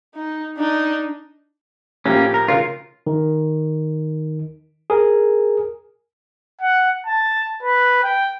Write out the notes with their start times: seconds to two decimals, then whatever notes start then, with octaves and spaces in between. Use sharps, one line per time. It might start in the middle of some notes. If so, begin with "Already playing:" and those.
0.16 D#4
0.58 D4 D#4
2.06 A2 F3 A#3 C#4 G4
2.34 A#4
2.48 C#3 F4 A#4
3.07 D#3
4.90 G#4 A#4
6.62 F#5
7.07 A5
7.63 B4
8.04 G5